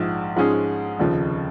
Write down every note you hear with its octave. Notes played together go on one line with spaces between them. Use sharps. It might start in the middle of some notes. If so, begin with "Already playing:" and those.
Already playing: A#1 G#2 F3
G#2 F3 G#3 C#4 G#4
F1 D#2 C#3 F3